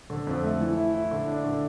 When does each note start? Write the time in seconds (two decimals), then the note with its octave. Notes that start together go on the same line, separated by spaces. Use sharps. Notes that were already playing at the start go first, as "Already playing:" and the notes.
0.10 D3
0.27 F2
0.44 A3
0.61 E3
0.77 E4
0.94 E4
1.11 D3
1.28 D4
1.45 D3